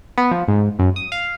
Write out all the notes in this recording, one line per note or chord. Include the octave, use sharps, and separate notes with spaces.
B3
F3
G#2
F#2
D#6
F5